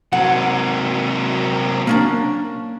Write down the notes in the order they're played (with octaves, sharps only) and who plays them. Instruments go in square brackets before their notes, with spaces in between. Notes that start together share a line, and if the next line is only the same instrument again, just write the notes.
[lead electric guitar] C3 F#3 [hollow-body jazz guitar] F#5
[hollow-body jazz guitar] A#3 C#4 D4